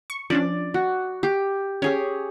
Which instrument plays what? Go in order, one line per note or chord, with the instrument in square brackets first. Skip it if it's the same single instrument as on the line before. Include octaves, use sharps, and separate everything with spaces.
[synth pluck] C#6
[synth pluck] F3 C#4 D4 [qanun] D5
[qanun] F#4
G4
[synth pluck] C#4 [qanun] G4 G#4 C#5